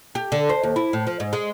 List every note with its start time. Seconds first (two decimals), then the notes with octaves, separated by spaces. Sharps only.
0.15 G4
0.32 D3
0.49 C5
0.63 D#2
0.76 E4
0.93 A2
1.07 F3
1.20 G#2
1.33 G#3